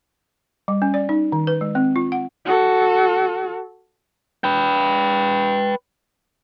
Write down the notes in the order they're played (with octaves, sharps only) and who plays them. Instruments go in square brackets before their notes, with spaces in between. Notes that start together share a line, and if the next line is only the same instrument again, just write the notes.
[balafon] G3
C#4
D5
D#4
D#3
B4
G#3
C4
F4
F#5
[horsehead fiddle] F#4 A4
[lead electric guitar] B4 G5